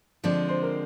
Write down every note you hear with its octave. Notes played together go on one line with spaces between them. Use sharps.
D3 F3 G#3 C4 D5
C5
A#4